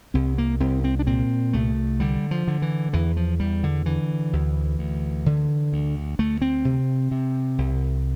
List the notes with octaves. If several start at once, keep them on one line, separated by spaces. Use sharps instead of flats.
C2 C4
A#3
C2 C4
C4
D4
A#2 C4
C2 A3
D3 G3
F3
D3
E3
E2 E3
F3
E2 G3
D3
D3 E3
D2
D2
D3
D2
D2 A3
C4
C3
C3
C2